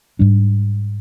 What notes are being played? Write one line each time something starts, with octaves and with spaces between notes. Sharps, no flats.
G#2 G3 D4